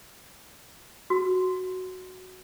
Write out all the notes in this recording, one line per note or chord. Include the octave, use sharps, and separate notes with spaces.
F#4